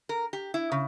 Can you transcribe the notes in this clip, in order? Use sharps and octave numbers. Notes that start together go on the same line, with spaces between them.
A#4
G4
E4
C#3